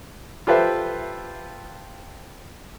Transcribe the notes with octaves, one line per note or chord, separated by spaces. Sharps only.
F4 G4 A4 B4 C5 E5